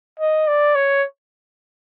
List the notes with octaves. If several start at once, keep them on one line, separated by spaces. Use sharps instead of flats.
D#5
D5
C#5